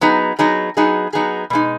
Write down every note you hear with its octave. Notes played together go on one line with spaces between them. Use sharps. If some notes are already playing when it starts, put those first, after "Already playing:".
F#3 B3 D#4 G#4
F#3 B3 D#4 G#4
F#3 B3 D#4 G#4
F#3 B3 D#4 G#4
B2 G#3 D#4